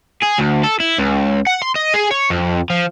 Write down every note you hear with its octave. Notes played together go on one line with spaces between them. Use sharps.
G#4
D2
A4
E4
C#2
F#5
C6
D#5
G#4
C#5
F2
F3